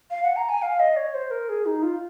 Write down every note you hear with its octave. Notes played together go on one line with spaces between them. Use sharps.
F5
F#5
A#5
G#5
F5
D#5
C#5
C5
A#4
G#4
D#4
F4